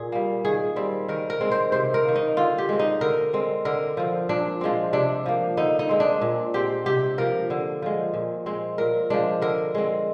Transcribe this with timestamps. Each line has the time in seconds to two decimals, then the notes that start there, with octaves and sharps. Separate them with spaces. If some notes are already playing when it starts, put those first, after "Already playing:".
Already playing: A#2 G#4
0.12 G3 A#3
0.45 D#3 G#4
0.76 G3 C4
1.08 D#3 A#4
1.30 A#4
1.41 G#3 C4
1.52 C5
1.72 C3 C5
1.94 A#4
2.05 D#3 A#3
2.16 D#4
2.37 D3 F4
2.58 G4
2.69 G#3 C4
2.79 D#4
3.01 D3 A#4
3.33 G#3 C4
3.65 D3 A#4
3.97 F3 C4
4.29 A#2 D4
4.61 F3 G#3 C4
4.93 C3 D4
5.26 F3 A#3
5.57 D3 D#4
5.79 D#4
5.89 G#3 C4
6.00 D4
6.22 A#2
6.54 G#3 C4 G4
6.86 C3 G4
7.18 F3 A#3 A#4
7.50 D3
7.82 F3 G#3
8.14 A#2
8.46 G#3 C4
8.78 A#2 A#4
9.10 F3 G#3 D4
9.42 D3 A#4
9.75 G#3 C4